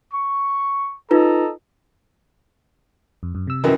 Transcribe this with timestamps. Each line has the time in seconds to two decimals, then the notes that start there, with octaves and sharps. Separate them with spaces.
0.13 C#6
1.11 D#4 F4 A4 B4 D#5 A#5
3.23 F2
3.35 F#2
3.47 C3 E6
3.64 F#2 D#3 E3